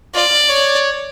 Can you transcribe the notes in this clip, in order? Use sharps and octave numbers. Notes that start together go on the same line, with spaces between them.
F4 D5
C#5